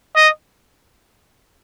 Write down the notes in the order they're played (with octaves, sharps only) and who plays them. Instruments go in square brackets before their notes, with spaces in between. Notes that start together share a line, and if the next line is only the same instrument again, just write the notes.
[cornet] D#5